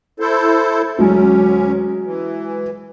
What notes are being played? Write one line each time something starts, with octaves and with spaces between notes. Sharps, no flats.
E4 A4 C5
D2 F#3 G#3 C#4
E3